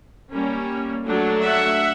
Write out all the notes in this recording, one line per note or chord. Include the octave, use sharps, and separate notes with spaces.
G3 A#3 C#4
F#3 A3 D4
E5 F#5